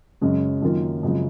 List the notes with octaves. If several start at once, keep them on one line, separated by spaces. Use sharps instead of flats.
F#2 C#3 G#3 C#4
F#2 D#3 A#3 F4
F#2 C#3 F3 G#3